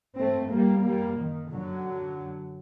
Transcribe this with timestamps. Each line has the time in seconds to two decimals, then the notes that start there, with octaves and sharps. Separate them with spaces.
0.18 G2 A3 C4
0.52 G3 A#3
0.85 F#2 G3 A#3
1.19 D#3
1.52 F#2 D3 F#3
2.18 F#2